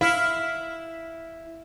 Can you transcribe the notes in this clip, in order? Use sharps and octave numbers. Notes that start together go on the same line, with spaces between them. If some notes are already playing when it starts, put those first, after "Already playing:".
E4 F5